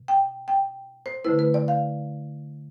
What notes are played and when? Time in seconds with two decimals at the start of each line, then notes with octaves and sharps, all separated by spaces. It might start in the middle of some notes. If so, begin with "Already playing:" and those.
Already playing: B2
0.08 G5
0.48 G5
1.06 C5
1.24 D3 A3 E4 B4
1.39 B4
1.54 D5
1.68 F5